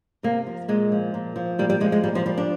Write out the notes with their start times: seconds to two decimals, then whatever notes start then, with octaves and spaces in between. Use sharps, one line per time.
0.23 C3 A#3
0.47 F3
0.68 A#2 G#3
0.92 F3
1.14 A#2
1.36 F3
1.59 A#2 G3
1.70 G3
1.80 F3 G#3
1.92 G#3
2.03 A#2 G3
2.15 F3
2.26 F3 G3
2.38 D4